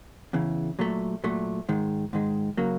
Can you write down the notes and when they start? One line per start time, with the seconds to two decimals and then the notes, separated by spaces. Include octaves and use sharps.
0.33 E2 C#3 E3
0.79 A#2 F#3 A3
1.24 A#2 F#3 A3
1.69 G#2 D#3 G#3
2.13 G#2 D#3 G#3
2.57 C#3 F#3 A#3